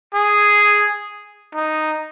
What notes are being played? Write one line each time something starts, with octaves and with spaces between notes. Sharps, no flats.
G#4
D#4